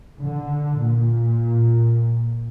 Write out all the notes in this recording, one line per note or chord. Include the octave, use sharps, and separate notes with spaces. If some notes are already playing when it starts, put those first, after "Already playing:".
D3
A#2